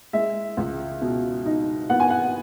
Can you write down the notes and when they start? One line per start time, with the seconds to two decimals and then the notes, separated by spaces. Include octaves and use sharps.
0.13 G#3 E5
0.57 C#2
1.01 B2
1.45 D#4
1.90 B3 F#5
2.00 G#5
2.10 F#5